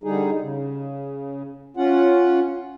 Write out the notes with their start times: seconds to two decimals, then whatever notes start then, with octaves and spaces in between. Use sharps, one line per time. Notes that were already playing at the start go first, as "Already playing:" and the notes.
0.04 D3 G3 D#4 G#4
0.41 C#3
1.77 C#4 F4 F#5